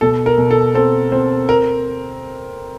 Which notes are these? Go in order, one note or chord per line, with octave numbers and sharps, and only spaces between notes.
B2 A4
A#4
B2
A4
C4 A4
C4
A#4